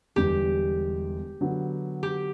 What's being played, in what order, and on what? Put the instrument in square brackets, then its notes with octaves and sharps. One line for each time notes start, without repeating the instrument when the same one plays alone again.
[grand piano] E1 E2 D3 G3 [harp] G4
[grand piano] D3 F#3 B3
[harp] G4